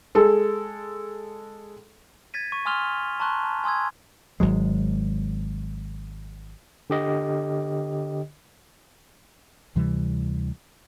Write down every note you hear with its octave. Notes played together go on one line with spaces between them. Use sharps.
G#3 A4
G#6 A6 B6 D#7
C#6 D#7
G#5 C6 D#6 F6 F7 G7
A5 A#5 C6 C#6 F#6
A5
G#5 C6 D#6 E6 G#6
G#1 F#3 G#3
D3 G4 D#5
D2 C3 E3 G3